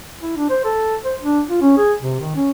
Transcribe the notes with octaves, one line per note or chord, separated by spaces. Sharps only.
E4
D4
C5
A4
C5
D4
F4
C#4
G#4
C3
D#3
C#4